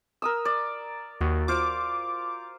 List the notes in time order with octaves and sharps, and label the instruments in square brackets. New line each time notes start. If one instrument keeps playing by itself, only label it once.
[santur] A#4 D#6 E6
D5
[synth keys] D#2 [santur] F#4
[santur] F4 C5 F5 [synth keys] D6